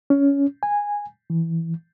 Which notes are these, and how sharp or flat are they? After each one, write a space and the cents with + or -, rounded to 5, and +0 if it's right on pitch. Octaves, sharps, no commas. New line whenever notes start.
C#4 +20
G#5 -15
E3 +0